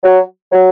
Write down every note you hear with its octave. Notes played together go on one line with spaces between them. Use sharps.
F#3
F#3